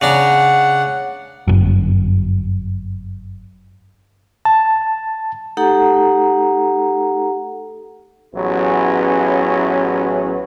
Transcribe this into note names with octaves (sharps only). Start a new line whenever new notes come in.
C#3 D4 F#5 A#5
G1 F#2
A5
A3 D#4 G4 A4 F#5 A#5
A1 F#3 B3 C#4 E4 G#4